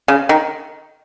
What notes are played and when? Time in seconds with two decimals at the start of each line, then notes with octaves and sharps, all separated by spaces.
0.08 C#3
0.29 D#3